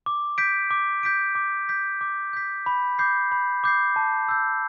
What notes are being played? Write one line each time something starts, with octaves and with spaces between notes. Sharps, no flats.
D6
G6 B6 D7
D6
G6 B6 D7
D6
G6 B6
D6
G6 B6
B5
D6 G6 C7
B5
D6 G6 C7
A5
E6 G6